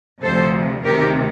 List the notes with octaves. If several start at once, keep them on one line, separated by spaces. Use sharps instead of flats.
D2 C3 F3 A4 C5
D2 C3 D#3 G4 A#4